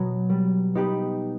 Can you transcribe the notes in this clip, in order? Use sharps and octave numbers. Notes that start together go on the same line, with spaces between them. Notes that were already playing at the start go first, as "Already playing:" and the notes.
Already playing: B2 F#3 B3
G3
B3 D#4 G4 B4